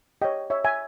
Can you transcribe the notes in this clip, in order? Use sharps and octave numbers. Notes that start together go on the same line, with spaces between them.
G4 C#5 D#5 G5
C#5 E5
E5 G#5